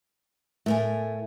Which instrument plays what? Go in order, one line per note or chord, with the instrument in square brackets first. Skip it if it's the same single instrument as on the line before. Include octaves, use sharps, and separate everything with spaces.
[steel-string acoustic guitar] A2 A#4 G#5 [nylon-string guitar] A3